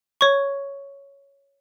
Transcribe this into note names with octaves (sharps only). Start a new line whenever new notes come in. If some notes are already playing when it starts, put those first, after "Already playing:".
C#5 C#6